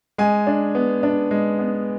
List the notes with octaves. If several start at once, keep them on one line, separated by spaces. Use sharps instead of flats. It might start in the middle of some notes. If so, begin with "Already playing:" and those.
G#3 G#5
D4
B3
D4
G#3
B3